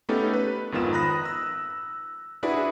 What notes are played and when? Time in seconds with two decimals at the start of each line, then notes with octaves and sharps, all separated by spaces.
0.09 A3 B3 C#4 D#4 G4 A4
0.34 B4
0.72 G#1 F2 D#3 B3 F4 E7
0.93 A#5 B5 D#6 F#6 A#6
1.25 E6
2.43 D4 E4 F#4 G#4 B4 D5